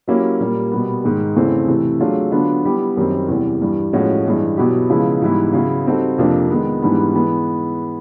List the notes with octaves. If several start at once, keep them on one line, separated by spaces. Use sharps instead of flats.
F#3 A#3 C#4 E4 G4
A#2 G3 A#3
B2 G3 B3
G#2 D#3 G#3
E2 C#3 E3 A3 C4
C3 E3 A3
F#3 A3 D4 F4 G#4
D3 F#3 B3 D4 F4
G3 B3 E4 G4
F#2 D#3 G3 C4
E2 C3 E3 G3
G2 E3 G3
A2 F3 G#3 C#4 F#4
G2 E3 G#3
B2 F#3 B3 E4 G4
C#3 F3 G#3 B3 E4
G#2 E3 G3 B3 E4
C#3 F#3 B3 E4
G3 C4 D#4 F#4 A4
F2 C3 F3 A#3 D4
D#3 G#3 B3
G#2 E3 G3 B3 D4
E3 G#3 B3